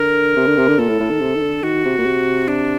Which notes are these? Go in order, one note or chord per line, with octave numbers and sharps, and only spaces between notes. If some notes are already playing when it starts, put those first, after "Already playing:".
Already playing: D3 A#4
C3
D3
C3
D3
A#2 A4
A2
A2
D#3
C3
D#3
D3
D#3 F#4
C3
A#2
C3
D4